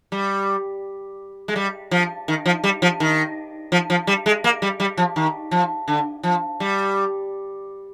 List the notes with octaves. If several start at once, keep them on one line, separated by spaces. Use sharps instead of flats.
G3
G#3
G3
F3
D#3
F3
G3
F3
D#3
F3
F3
G3
G#3
A#3
G3
G3
F3
D#3
F3
D3
F3
G3